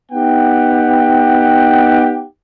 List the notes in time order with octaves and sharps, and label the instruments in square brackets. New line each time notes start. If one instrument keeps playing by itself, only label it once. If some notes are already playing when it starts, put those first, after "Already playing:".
[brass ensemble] B3 D#4 G4 F#5 G5